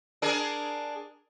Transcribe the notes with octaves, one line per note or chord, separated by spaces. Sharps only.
D4 G#4 A#4